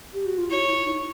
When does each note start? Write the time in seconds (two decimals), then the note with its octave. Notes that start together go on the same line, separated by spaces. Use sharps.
0.14 G4
0.26 F#4
0.38 F4
0.49 E4 C#5
0.68 E4
0.86 D#4